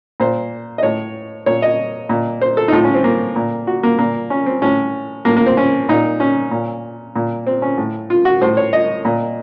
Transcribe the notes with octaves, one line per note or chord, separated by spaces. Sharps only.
A#2 C5
D#5
A2 C#5
A#2 C#5
D#5
A#2
C5
A4
D#4
A2 F4
C#4
C4
A#3
A#2
F#4
A#3
A#2 A#3
C#4
C4
A2 C#4
A2 A#3
A#3
C4
C#4
A#2 D#4
C#4
A#2
A#2
C4
C#4
A2
F4
F#4
A2 C5
C#5
D#5
A#2